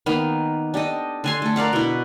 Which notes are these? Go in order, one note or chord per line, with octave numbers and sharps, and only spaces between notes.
D#3 A#3 B3
D4 G4 A4 D#5
D3 G#5 C6
A3 A4
A#4 D5 F5 F#5
B2 E4